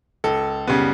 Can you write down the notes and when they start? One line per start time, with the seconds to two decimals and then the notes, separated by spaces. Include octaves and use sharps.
0.24 C#2 A4
0.67 C#3 G3 B3